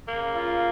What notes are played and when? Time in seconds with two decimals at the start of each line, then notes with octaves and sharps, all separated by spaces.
0.08 C#3 A#3
0.35 F4